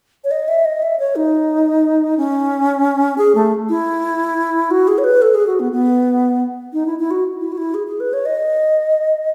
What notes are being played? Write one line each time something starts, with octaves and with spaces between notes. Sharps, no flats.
C#5
D#5
E5
D#5
E5
C#5
D#4
C#4
G#4
A3
E4
F#4
G#4
C#5
B4
A4
G#4
F#4
B3
B3
D#4
E4
E4
F#4
E4
F#4
E4
G#4
G#4
B4
C#5
D#5